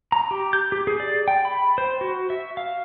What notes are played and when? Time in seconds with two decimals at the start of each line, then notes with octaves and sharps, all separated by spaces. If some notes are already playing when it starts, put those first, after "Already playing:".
0.12 A#5
0.31 G4
0.53 G6
0.72 G4
0.87 G#4
1.00 D5
1.28 G5
1.45 B5
1.78 C5
2.01 F#4
2.30 E5
2.57 F5